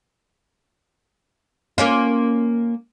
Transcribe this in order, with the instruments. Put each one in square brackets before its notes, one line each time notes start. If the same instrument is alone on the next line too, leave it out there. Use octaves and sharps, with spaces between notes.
[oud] A#3 C#4 F4